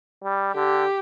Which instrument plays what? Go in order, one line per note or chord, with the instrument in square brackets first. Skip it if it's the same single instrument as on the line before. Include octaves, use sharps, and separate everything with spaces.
[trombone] G3
[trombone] D3 [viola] G4